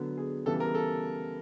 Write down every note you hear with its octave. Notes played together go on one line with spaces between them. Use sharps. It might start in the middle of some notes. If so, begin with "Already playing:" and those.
Already playing: D3 F#3 B3
G#4
C#3 E3 G3 B3 A4
A#4
A4